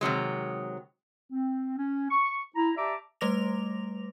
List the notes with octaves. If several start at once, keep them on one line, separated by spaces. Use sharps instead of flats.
C3 D#3 F#3 G#3
C4
C#4
C#6
E4 A#5
G4 D5 E5 A5 A#5 D6
G3 A3 B4 D6 A#6 F7